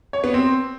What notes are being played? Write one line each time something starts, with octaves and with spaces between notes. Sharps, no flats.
C#5
B3
C4